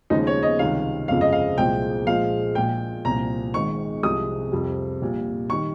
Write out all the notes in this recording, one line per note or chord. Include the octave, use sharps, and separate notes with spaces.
D#2 C#3 F3 G#3 D#4
C#5
D#5
C#2 C3 D#3 G3 F5
G1 F2 C#3 F3 G#3 F5
D#5
F5
C2 A#2 F3 G#3 G5
A#1 A#2 F3 G#3 F5
A#1 A#2 G#3 G5
C2 A#2 F3 A#5
G#1 G#2 D#3 G#3 C#6
C2 C3 F3 G#3 D#6
F2 C3 G3
A#1 A#2 G3
D#3 G3 C#6